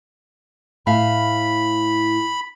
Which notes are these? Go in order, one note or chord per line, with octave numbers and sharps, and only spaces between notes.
A2 E5 F5 B5